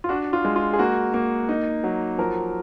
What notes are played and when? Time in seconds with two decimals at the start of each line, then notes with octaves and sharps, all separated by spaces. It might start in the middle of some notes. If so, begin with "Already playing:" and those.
0.04 F4
0.09 D4 F#4
0.33 F4
0.45 G#3
0.56 F4
0.73 G#4
0.79 A#3 F#4
1.14 A#3
1.49 D#4
1.84 F#3
2.18 F3 A#4